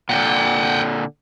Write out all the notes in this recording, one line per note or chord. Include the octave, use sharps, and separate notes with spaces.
A#2 D3 F#5 G5